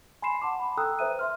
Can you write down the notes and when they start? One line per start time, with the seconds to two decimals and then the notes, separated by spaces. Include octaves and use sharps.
0.22 G#5 B5 C6 C7 E7
0.42 F#5 A5 C6 D6
0.60 B5
0.77 A4 G5 A#5 D#6 E6 F#6
0.99 B4 C5 E5 D#7
1.19 E5 C6 F6